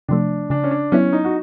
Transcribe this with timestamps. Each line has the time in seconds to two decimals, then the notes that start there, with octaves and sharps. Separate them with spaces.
0.08 C3 F3 A3 D4
0.50 C#3 D4
0.64 C#4
0.71 D4
0.92 F#3 B3 C#4 E4
1.12 D#4
1.24 F#4